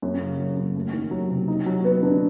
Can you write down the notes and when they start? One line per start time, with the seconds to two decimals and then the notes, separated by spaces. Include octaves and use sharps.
0.02 F#2
0.21 C#3
0.39 F#3
0.57 F#2
0.76 A3
0.93 D#3
1.11 F#3
1.29 C3
1.48 D#4
1.66 F#3
1.85 B3
2.03 D3